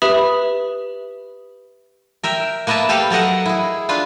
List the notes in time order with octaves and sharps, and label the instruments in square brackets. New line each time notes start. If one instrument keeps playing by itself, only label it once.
[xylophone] G4 B4 E5 B5 D#6
[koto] A#4 E5 G5
A#3 B4 D#5 E5 A5
G4 A4 B4 F5 G5
F#3 A4 A#4 D#5 F#5
E4 G#4
D4 F4 B4